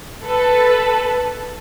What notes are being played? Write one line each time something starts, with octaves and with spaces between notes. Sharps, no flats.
A4 B4